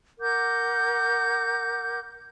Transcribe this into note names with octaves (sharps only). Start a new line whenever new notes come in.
A#4 F#5 D6 G6